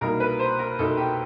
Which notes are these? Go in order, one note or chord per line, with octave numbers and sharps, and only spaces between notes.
C2 B2 G3 A#3 D#4 A#4
B4
C5
A#4
C2 B2 G3 A#3 D#4 A4
G4